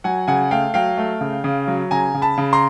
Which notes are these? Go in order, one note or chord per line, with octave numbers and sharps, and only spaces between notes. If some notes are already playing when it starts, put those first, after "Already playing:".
F#3 F#5 G#5
C#3 F#5 G#5
A3 F5 G5
F#3 F5 G5
A3
C#3
C#3
F#3
C#3 G#5 A#5
C#3
A5 B5
C#3
A#5 C6